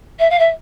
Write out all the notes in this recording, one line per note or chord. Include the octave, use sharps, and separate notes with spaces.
E5
F5
E5